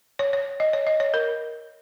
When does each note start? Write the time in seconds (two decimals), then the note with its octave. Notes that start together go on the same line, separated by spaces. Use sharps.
0.19 C#5
0.33 C#5
0.60 D#5
0.73 C#5
0.87 D#5
1.00 C#5
1.14 A#4